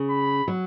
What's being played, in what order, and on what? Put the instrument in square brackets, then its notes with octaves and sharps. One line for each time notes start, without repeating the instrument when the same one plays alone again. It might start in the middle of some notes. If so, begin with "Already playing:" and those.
Already playing: [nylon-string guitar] C#3
[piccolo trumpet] B5
[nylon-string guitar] F#3